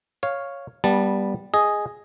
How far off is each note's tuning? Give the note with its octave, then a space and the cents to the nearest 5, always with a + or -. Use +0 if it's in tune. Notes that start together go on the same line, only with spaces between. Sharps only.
C#5 +0 F5 +0
G3 +0 B3 -25 A5 +0
G#4 +0 D#5 +0